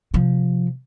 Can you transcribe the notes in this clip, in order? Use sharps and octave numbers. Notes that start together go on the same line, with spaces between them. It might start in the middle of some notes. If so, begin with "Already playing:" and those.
C3 F3